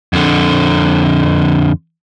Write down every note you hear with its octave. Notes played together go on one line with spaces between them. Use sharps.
F2 D3